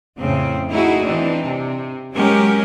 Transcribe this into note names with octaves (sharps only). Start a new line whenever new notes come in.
F2 A2 C#3 C4
A3 D#4 E4 F#4 G#4
E3 C4 D4 D#4
C3
F#3 G#3 C#4 G4 A#4